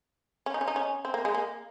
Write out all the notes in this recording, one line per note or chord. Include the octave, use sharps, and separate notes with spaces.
C#4
D#4
C#4
D#4
C#4
C4
A#3
G#3
A#3